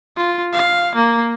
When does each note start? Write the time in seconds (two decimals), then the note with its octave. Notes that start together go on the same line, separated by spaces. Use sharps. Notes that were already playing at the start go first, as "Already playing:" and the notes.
0.17 F4
0.53 F5
0.95 A#3